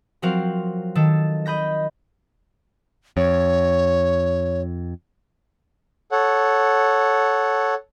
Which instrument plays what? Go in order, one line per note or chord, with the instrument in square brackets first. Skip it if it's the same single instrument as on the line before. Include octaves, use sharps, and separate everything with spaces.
[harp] F3 F#3 C4 F#4 A#4 F5
D#3 A4
D#5 B5 G6 A#6
[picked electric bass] F2 [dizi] C#5
[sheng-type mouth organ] A4 C#5 F#5